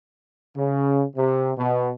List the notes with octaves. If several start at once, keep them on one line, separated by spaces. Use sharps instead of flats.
C#3
C3
B2